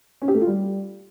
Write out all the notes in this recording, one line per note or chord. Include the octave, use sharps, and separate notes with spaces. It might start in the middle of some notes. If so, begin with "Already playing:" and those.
C#4
G4
A3
F4
G3